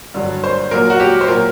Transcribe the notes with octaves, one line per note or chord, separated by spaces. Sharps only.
G2 D3 F#3
C5
A#2 F#3 A#4
F#4
G4
C5
A#2 F#3 A#4